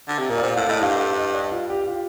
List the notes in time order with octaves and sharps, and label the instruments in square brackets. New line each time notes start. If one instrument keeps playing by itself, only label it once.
[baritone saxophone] D3
C3
[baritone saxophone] A#2 [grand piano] A#4
[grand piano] D5
[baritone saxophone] A#2 [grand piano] C5
[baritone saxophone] A2 [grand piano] F5
[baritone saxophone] A2 [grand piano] D#5
[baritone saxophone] G2 [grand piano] F5
[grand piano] F5
D#5
D5
F4
G4
F4